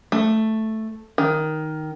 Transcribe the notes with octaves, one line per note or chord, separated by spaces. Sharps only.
A3
D#3